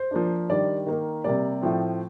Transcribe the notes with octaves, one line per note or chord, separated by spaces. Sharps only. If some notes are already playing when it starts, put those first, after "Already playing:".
Already playing: C5
F3 A#3 D4
D#3 G3 D4 D5
D#3 A#3 D#4
C3 G3 A#3 D5
A2 F3 C4